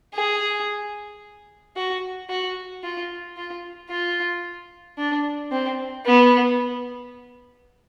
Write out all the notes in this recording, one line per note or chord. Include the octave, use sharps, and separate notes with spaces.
G#4
F#4
F#4
F4
F4
F4
D4
C4
B3